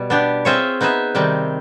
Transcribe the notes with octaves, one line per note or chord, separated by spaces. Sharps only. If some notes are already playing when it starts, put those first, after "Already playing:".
Already playing: B2 G3
B3 D4 G4
C4 F4 G#4 C#5 E5
B3 D#4 G#4 B4 E5
C3 D#3 G3 C4